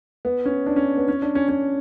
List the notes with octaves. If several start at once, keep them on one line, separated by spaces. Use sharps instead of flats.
B3
C#4
D4
C#4
B3
C#4
D4
C#4
C#4